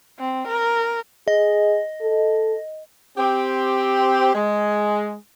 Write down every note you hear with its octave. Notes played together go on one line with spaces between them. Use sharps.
C4
A#4
G#4 D#5
A4
C4 G4
G#3